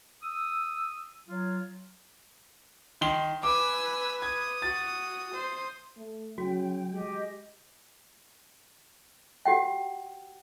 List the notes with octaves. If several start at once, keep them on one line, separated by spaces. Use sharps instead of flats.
D#6 E6
F#3 F4
D#3 C6 G7
B4 G#5 D6 E6
D#6 G#6
F#4 A6
C5
A3
C#3 F#3 F#4 G5
G#3 G4 D#5
F#4 G4 F#5 G5